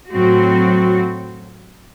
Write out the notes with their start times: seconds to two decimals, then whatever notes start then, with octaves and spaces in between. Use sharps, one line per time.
0.11 A2 F#3 C4 F#4